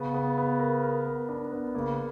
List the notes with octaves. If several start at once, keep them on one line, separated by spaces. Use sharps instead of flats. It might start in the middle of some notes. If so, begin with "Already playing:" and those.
Already playing: C#3 B3
B3
B3
A#4
A#4
B3
D4
B3
C#3 A#3